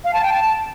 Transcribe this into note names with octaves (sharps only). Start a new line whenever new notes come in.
F5
A5
G5
A5